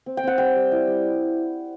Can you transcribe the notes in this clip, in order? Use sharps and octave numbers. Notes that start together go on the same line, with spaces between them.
C4
G5
C4 F#5
G3 G5
G3
E4
G3